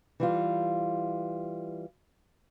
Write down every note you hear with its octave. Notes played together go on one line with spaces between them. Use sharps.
E3 G3 F4